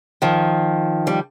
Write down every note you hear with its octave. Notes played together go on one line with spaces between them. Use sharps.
D#3 F3
G3